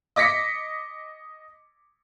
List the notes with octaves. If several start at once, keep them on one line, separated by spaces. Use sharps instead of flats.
D#5 D6 A#6 B6 C#7